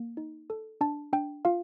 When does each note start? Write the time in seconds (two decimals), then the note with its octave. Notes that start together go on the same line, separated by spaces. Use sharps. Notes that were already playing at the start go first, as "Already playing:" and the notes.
Already playing: A#3
0.17 D#4
0.50 A4
0.81 D4 A5
1.13 D4 G5
1.45 F4 F5